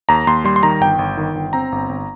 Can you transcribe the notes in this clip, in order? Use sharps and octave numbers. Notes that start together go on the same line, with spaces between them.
D#2 A#5
D#2 C6
G3 C6
C6
D#3 A#5
G1 G5
G1
D#3
G1
C4 A#5
G1
G1